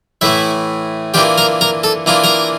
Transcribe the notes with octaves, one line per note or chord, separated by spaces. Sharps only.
A2 E3 A3 E4 E5
E3 A#3 D4 F4 G4 G5
A#4 A#5
A#4 A#5
A4 A5
E3 A#3 D4 F4 A#5
A#4 A#5